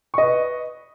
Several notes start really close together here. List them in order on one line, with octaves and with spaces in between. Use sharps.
C#6 D#5 B4